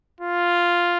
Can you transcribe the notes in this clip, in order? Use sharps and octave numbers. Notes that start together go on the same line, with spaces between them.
F4